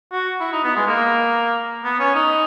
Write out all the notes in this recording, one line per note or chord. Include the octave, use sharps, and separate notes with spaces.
F#4
E4
D#4
B3
G#3
A#3
B3
C#4
D#4